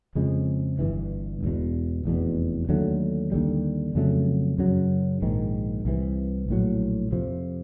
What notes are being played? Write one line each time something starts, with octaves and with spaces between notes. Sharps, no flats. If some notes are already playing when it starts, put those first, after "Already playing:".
F2 C#3 F3 G#3
G1 G2 E3
E1 E2 B2
F1 E2 B2
D#2 D3 F#3 A3
D#2 D3 G3
F2 C#3 F#3 A3
F#2 C#3 F#3
A#1 G#2 D#3
C2 C3 E3
A#1 A2 F#3
F2 C3 F3